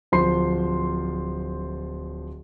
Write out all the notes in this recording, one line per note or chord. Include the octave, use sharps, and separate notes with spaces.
D1 F3 C5 C6 C7